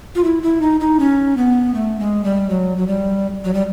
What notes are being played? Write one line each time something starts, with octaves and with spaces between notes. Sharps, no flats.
F4
E4
E4
D#4
D#4
C#4
B3
A3
G#3
G3
F#3
F#3
G3
F#3
G3